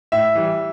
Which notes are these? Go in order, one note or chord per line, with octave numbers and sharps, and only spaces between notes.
A2 E5
E3 G3